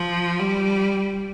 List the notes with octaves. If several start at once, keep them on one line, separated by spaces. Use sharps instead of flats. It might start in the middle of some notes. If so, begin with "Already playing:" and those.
Already playing: F3
G3